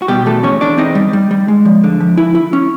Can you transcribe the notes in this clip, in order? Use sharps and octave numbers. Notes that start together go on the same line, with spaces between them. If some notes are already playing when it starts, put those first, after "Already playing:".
F#4
B2 G3 G4
E2 A3 A4
E2 C#4 C#5
E2 D4 D5
C4 D#4 D#5
G3
G3
G3
G#3
F3
D3
F3
E4
E4
C#4